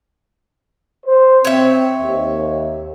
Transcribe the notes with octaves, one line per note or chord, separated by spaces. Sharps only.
C5
C4 C#5 E5
D#2